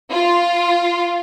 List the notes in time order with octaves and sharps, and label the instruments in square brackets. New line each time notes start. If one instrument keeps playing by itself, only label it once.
[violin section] F4